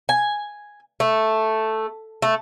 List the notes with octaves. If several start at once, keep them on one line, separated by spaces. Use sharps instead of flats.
G#5
A3
A3